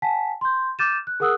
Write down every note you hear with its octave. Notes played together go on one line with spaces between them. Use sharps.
F#5 G#5 A5 B6
C6 G6
D6 F6 G6 A6 D#7 E7
F#6
G#4 A#4 F#5 D#6 E6 F#6